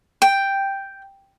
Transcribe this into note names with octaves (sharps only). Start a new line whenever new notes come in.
G5